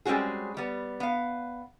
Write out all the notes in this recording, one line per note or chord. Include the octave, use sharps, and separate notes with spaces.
G3 G#3 C4 C#4 F#4 G#4
G3 B3
B3 F5